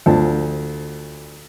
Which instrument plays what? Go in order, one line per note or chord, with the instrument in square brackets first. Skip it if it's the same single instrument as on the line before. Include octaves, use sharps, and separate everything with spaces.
[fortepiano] D2 F3 A5